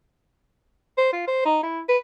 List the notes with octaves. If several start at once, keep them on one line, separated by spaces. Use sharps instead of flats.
C5
F4
C5
D#4
E4
B4